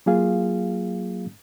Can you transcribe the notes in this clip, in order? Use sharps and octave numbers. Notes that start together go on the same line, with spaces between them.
F#3 A#3 F4 G#4 F5